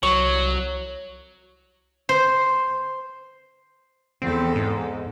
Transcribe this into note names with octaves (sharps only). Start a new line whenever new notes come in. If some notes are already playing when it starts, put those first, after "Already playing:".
C2 F#3 C#5 C#6
C5
E2 C4 A4
G#2